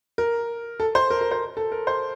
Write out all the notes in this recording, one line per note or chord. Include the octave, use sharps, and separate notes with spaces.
A#4
A4
C5
A#4
A#4
C5
A4
A#4
C5